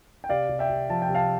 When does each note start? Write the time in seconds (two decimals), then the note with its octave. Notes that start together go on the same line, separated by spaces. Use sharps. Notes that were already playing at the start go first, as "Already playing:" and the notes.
0.24 G5
0.29 C3 D5 F5
0.49 C3
0.59 E5 G5
0.70 C3
0.89 F3 A5
1.02 G5
1.09 C3
1.15 F5 A5